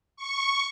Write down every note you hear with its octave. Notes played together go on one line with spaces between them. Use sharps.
C#6